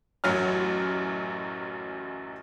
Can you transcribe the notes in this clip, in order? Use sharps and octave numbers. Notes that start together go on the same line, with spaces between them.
A1 F#2 F#3 C#4 F6